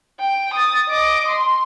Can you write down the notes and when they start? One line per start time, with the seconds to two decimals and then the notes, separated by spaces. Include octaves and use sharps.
0.20 G5
0.54 D#6 A6
0.89 D#5 D6
1.28 C6